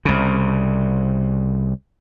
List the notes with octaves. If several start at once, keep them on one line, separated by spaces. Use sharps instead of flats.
C2 C#3